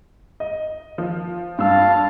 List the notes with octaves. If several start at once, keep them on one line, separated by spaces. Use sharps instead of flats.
D#5
F3
G2 F5 A5 E6